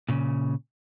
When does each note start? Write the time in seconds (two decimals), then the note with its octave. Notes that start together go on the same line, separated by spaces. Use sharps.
0.09 A#2 C#3